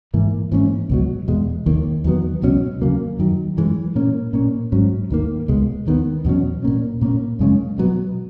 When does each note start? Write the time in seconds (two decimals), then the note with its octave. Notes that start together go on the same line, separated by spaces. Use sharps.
0.14 G#2 E3 A#3
0.52 G#2 E3 A#3 C#4
0.89 C#2 B2 F#3
1.28 E2 B2 G#3
1.66 D#2 D#3 A#3
2.04 E2 D#3 F#3 B3
2.42 C#2 B2 F#3 C#4
2.81 D#2 C#3 F#3 A#3
3.19 F#2 D#3 F#3
3.57 F#2 E3 G#3
3.95 A#2 A#3 C#4
4.33 A#2 A#3 C#4
4.72 G#2 F#3 C#4
5.10 D#2 D#3 A#3
5.48 C#2 B2 G#3
5.87 D#2 D#3 G#3 B3
6.25 E2 B2 F#3 C#4
6.63 A#2 A#3 C#4
7.01 A#2 A#3 C#4
7.39 F#2 C#3 G#3 C#4
7.78 B2 F#3 B3